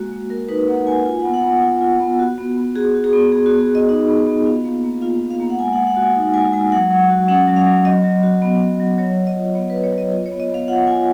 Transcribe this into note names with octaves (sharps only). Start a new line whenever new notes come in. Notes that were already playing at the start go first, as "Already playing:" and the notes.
Already playing: G#3 A#3 F#4
A#3
F#4 A#4
D#4 B4
A#3 F#5
A#3 G#5
F4 G#5
F#5
B3
F#5
B3
F4
F4
B3
F#4
B3
B3
F#4 G#4
F#4
G#4
B3
B3 G#4
F#4
B3
G#4
F#4
D#5
D#4 D#5
B3
B3
F4 F5
A#3
A#3
F4 F5
F4
F5
A#3
F#5
G#3 G#5
G#3 F#5
F#5
F#4 G#5
D#4
G#3 G#5
G#3 G#5
F#3 F#5
F#3
F#4
C#4 F#5
F#3
F5
F#3
F#3 D#5
F#3
F#4
B3
F#3
F#3
F#3 C#5
F#3
D#5
F4
B3 C#5
F#3 B4
C#5
F#3
D#5
F4
C#5
B3
D#5
B3 F5
F4 F#5
F4 G#5